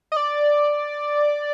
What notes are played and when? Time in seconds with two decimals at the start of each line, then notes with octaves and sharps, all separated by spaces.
0.12 D#5
0.17 D5